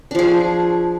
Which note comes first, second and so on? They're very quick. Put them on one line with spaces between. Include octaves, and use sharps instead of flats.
D4 F3 G#4